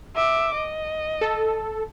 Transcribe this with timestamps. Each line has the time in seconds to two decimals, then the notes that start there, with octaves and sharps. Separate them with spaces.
0.15 E5 D6
0.55 D#5
1.21 A4